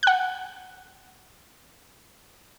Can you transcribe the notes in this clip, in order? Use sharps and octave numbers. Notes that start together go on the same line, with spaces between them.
F#5 F#6